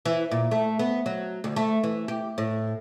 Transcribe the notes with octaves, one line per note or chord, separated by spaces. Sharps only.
E3
A#2
A3
B3
F#3
D2
A3
E3
G4
A2